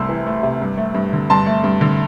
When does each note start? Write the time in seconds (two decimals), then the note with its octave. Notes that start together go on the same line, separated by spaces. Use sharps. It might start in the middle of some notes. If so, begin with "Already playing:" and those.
Already playing: C2 C3 A3 C6 E6
0.09 E3
0.27 A3
0.43 C3
0.61 G2
0.78 A3
0.95 G2
1.13 D3
1.30 G2 A5 C6
1.47 A3
1.64 G2
1.81 D3